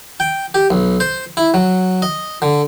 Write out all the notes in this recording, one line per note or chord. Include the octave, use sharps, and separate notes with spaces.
G5
G4
B1
C5
E4
F#3
D#5
D3